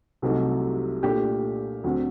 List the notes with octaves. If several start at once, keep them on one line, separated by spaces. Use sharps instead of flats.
C2 C3 F#3 A3 D#4
A#2 A3 D4 G4
D2 D3 F#3 C4